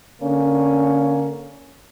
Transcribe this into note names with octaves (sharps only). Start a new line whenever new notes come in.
D3 A#3 C#4